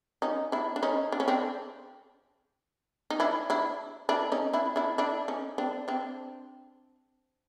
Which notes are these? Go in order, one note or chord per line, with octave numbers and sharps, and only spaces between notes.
C#4 D#4
D4 E4
D4
C#4 D#4
D4
C#4
C4 D4
D#4
D4 E4
D4 E4
D4 E4
C#4 D#4
D4 E4
D4 E4
D4 E4
C#4 D#4
C4 D4
C4 D4